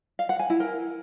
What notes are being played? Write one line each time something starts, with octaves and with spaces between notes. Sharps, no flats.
F5
F#5
G#5
E4
A#4